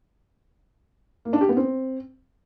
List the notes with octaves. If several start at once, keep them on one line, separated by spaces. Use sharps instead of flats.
A#3
D4
G4
B3
C4